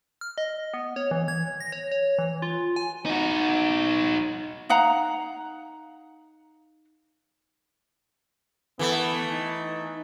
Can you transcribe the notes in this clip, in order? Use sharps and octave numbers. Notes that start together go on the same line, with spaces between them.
F6
D#5
B3
C#5
E3
G#6
A#6
C#5
C#5
E3
F4
G#5
D#4 F#4
D#4 F5 F#5 A#5
E3 A3 B3
D#4